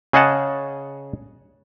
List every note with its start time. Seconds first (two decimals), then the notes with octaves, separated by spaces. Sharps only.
0.13 C#3 G#4 D#5 F#5 A5